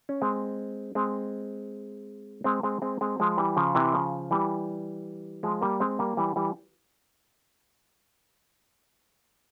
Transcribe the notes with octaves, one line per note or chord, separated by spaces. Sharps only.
C#4
G#3 C4
G#3 C4
G#3 C4
G#3 C4
G#3 C4
G#3 C4
F3 G#3
E3 G3
C#3 F3
C3 E3
C#3 F3
E3 G3
F3 G#3
G3 A#3
G#3 C4
G3 A#3
E3 G3
E3 G3